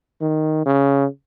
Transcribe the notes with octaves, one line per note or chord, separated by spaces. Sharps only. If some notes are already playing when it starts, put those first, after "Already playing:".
D#3
C#3